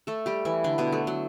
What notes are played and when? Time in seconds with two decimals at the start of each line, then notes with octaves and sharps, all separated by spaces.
0.07 A3 A4
0.26 G3 G4
0.45 E3 E4
0.64 D3 D4
0.78 B2 B3
0.92 A3
1.07 F#3